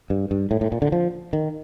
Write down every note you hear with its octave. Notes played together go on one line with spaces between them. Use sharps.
G2
G2
A2
A2
A#2
D3
F3
D#3